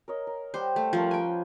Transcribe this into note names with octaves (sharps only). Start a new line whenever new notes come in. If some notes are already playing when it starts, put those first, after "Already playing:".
A#4 C#5 D#5
A#4
G3 G4 C5 F#5
A3
F3 G3 C#4 A#4 C5
B4 G5 G#5